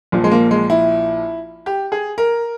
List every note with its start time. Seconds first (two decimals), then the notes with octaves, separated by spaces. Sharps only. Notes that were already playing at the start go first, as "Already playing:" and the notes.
0.12 A#1 A#2 F3
0.24 G#3
0.31 A#3
0.51 G#3
0.70 E4
1.66 G4
1.92 G#4
2.18 A#4